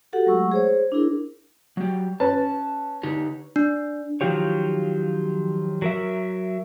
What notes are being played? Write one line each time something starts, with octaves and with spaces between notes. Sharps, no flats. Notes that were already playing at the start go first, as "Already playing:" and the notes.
F#4 G4 A4 F#5
F#3 G#3 A3 F#5 C#6 E6
G#4 C5 C#5
D4 E4 G#4 A#4
F#3 G4
C#4 B4 A5
D3 D#4 G4
D4
D#3 F3 F#3 F4 G4 C#5
F#3 A#4 E5